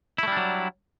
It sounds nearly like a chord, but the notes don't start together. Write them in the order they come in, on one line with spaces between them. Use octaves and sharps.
E4 A3 G3 D4 F#3